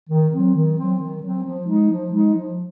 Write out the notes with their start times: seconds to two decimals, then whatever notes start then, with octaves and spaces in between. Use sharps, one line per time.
0.10 D#3
0.33 F#3 C4
0.55 D#3
0.77 F#3 C4
1.00 D#3
1.23 F#3 C4
1.45 F3
1.68 G#3 D#4
1.90 F3
2.12 G#3 D#4
2.35 F3